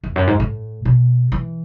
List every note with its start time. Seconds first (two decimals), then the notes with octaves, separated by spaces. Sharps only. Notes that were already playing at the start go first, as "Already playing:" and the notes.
0.04 E2
0.16 F#2
0.27 G#2
0.40 A2
0.85 B2
1.32 E3